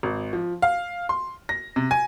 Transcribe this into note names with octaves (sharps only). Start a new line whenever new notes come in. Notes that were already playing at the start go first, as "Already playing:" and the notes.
G#1
F3
F5
C6
A#6
C3
G#5